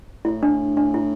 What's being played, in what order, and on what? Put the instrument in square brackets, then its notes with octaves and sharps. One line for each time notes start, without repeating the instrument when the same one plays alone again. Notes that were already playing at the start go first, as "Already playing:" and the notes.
[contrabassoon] A2 [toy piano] E4
[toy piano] D4
D4
E4